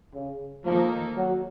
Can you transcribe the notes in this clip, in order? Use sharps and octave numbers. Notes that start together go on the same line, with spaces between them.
C#3
D#3 F3 A#3 D#4 A4
F#3